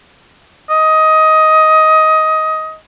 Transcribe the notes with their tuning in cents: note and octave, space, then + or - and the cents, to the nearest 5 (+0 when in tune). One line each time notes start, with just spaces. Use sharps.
D#5 +15